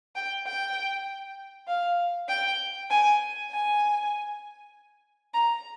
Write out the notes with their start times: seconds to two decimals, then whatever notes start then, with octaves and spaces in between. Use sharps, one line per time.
0.16 G5
0.46 G5
1.67 F5
2.28 G5
2.90 G#5
3.51 G#5
5.34 A#5